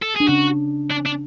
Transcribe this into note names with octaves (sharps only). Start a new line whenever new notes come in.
A4
D4 G#4
C#3 C#4 F#4
D4
D4